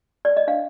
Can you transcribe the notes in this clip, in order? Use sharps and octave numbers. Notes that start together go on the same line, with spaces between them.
D5
D#5
D4 F5